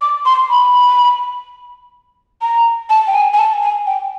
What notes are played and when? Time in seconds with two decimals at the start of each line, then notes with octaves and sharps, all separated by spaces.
0.02 D6
0.26 C6
0.50 B5
2.42 A#5
2.90 A5
3.07 G5
3.15 G#5
3.34 G#5
3.39 A5
3.62 G#5
3.87 G5